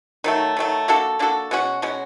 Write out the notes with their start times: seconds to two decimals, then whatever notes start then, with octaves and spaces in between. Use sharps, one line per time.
0.24 D#3 F#3 A3
0.57 D#3 F#3 A3
0.88 A#3 D4 F#4 A4
1.19 A#3 D4 F#4 A4
1.51 B2 G#3 C#4 F#4
1.82 B2 G#3 C#4 F#4